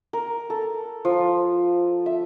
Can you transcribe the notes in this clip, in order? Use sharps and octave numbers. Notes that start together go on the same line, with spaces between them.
A#4
A4
F3
E5